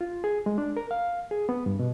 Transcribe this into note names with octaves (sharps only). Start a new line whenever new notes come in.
F4
G#4
G#3
D4
A#4
F5
G#4
B3
G2
B2